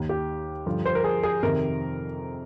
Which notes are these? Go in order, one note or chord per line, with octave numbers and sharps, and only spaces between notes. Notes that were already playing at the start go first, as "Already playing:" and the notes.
Already playing: D#2 D#3
G4
G2 D3 F3
C5
A#4
G#4
G#4
F2 C3 D#3 A#4